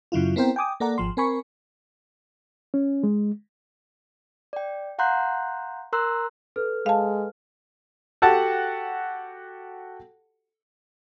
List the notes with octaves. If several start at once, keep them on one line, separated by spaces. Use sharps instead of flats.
F#2 C#3 F#3 E4 F4
B3 C4 E4 A#4 C5 G5
G5 G#5 D6 D#6
A#3 A4 D5 F#5 A#5
G#1 F3 C6
C4 A#4 G#5 B5 C#6
C#4
G#3
D5 G5
F5 F#5 A#5 C6 F#6 G6
A#4 A#5 C6 E6 F#6
A4 B4 F6
G#3 F5 A5
F#4 G4 A4 F#5 A5